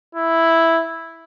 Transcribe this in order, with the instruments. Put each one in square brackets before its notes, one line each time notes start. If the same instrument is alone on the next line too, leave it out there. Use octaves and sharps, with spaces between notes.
[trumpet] E4